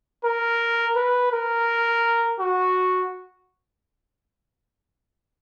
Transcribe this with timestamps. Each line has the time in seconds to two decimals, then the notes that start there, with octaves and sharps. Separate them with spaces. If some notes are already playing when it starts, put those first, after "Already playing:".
0.24 A#4
0.96 B4
1.32 A#4
2.39 F#4